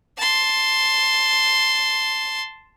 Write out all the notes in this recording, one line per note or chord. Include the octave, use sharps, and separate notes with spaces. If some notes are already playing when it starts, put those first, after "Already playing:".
A5 C6